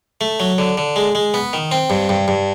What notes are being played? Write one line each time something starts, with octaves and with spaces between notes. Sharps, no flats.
A3
F#3
D3
D3
G#3
G#3
B3
D#3
C4
G2
G2
G2